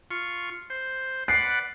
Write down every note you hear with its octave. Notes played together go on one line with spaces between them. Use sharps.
F4 C#6
C5
B4 D5 F#5 C7